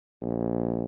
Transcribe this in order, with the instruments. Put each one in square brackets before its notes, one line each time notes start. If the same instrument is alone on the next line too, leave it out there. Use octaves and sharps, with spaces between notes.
[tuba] A#1